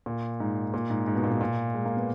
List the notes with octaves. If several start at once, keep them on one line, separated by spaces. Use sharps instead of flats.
A#2
G#2
A#2
G#2
G#2
B2
A#2
B2
A#2
G#3
A#3
B3